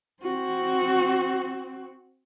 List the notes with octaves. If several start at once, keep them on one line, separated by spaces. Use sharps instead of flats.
C4 F#4